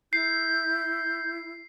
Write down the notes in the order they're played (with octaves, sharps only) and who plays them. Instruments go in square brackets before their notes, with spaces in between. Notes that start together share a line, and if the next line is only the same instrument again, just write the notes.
[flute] E4 [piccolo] G6 [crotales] C7